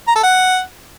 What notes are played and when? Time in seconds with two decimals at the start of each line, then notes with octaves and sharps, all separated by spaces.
0.08 A#5
0.16 A4
0.23 F#5